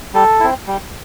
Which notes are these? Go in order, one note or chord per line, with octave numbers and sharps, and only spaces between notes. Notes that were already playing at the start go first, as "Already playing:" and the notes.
G3 A4
C4 E4
G3